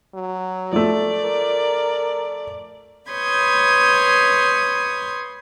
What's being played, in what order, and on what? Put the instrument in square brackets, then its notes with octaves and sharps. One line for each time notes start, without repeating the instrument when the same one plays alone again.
[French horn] F#3
[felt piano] F3 A3 [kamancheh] D5
[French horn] A#4
[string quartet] B4 C#5 C6 D#6 G6 G#6